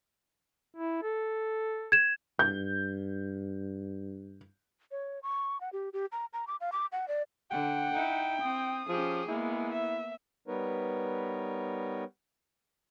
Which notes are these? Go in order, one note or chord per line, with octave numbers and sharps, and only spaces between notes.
E4
A4
G#6 E7
G2 G6
C#5
C#6
F#5
G4
G4
A#5
A#5
D6
F5
D6
F#5
D5
D3 F#5 G5
D#4 E4
C4 D#6
F3 C#4 G4 G#4
G#3 A#3 B3 E4
E5
G3 B3 D#4 A#4 B4 C#5